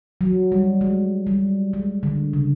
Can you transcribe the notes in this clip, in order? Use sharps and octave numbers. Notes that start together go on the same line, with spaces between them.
F#3
G3
G#3
G3
G#3
D3
C#3